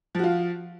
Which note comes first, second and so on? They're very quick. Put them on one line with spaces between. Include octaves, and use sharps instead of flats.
F3 F#4 F4